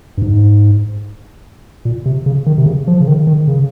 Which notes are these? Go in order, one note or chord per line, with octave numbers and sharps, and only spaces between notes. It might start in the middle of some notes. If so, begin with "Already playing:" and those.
G2
G#2
A#2
C3
C#3
D#3
C3
C#3
F3
C#3
D#3
D#3
C#3